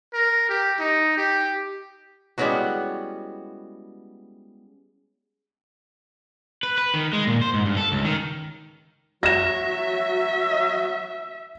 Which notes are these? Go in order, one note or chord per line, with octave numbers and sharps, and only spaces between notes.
A#4
G4
D#4
G4
G3 G#3 B3 C#4 E4 F#4
B4
B4
D#3
G#3
A#2
C5
G#2
G2
A4
C#2
D#3
F#3 F#4 E5 A#6 E7